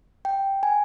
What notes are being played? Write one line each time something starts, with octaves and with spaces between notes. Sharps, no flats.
G5
G#5